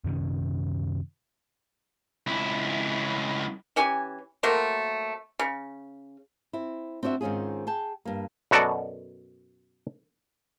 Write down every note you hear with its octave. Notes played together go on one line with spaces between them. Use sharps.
F#2 C3 D#3 C#4
C#2 E4
E3 C#4 G4 G#5
F#3 A3 A#3 C4
C#3
C4 E4
C4 D4 F#4 D5 E5
G#2 D#3 C4 C#4 F4 G#4
G#4 G5 A5
G2 A#3
F#2 B2 F#4 A4 D5 A5